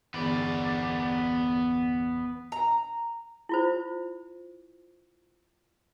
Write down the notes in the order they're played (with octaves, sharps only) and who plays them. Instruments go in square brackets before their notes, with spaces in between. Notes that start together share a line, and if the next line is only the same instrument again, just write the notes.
[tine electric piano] G1 E2 B5 [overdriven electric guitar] B3 D5
[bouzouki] A#5
[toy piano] E4 F4 C5